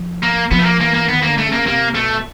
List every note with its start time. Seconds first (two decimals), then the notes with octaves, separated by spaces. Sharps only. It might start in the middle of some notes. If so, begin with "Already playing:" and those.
Already playing: F3
0.23 A#3
0.51 F3 B3
0.59 A3
0.66 A#3
0.80 E3 A#3
0.94 A#3
1.09 D#3 B3
1.23 A#3
1.28 D3
1.38 A3
1.47 C#3
1.52 A#3
1.67 C3 A#3
1.95 B2 A3